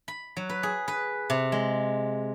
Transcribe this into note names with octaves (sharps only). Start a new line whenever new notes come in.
B5
F#3
B4
G#4
B4
C3
G#3